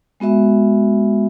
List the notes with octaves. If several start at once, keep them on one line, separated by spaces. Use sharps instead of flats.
G#3 B3 F#4 E5